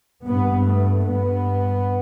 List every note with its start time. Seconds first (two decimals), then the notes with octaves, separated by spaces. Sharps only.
0.25 G2 B3
0.65 A3
1.04 G2 B3